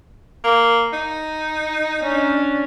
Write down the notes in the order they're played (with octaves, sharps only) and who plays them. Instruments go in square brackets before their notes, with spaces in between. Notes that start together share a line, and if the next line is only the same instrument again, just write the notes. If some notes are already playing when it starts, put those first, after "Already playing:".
[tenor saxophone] A#3
D#4
[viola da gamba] C#4 D4